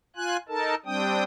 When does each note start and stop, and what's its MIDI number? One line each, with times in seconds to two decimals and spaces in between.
0.16 0.37 65
0.16 0.37 80
0.16 0.37 90
0.49 0.75 63
0.49 0.75 69
0.49 0.75 70
0.49 0.75 81
0.86 1.23 55
0.86 1.23 60
0.86 1.23 62
0.86 1.23 79
0.86 1.23 87